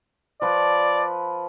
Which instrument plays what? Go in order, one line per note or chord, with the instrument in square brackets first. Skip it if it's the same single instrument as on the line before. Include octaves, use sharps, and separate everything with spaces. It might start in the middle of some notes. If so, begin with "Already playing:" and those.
[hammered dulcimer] F3 B4 [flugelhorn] D5